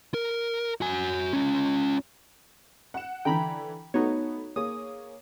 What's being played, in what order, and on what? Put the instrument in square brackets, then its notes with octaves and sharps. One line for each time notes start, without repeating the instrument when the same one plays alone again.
[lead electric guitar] A#4
F#4 G#5
C#4 F4
[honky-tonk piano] F#5 E7
[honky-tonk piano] D3 E3 [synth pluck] G5 A#5 B5
[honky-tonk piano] A3 B3 [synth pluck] D#4 F#4 C#5
[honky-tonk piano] A#3 G#4 C#5 [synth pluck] D#6